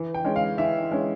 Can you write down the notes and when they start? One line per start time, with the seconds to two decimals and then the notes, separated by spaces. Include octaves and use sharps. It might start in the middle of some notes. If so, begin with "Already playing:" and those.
Already playing: E3
0.14 G5
0.25 G#3 C#4
0.36 F5
0.58 E3 E5
0.91 G#3 C#4